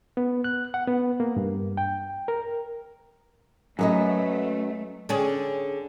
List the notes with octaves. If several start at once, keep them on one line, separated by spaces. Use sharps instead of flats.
B3
F#6
F#5
B3
A#3
G2
G5
A#4
F#2 F#3 A3 B4 D#5
D3 C#4 G#4